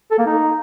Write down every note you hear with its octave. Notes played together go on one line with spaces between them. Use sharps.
A4
A#3
D#4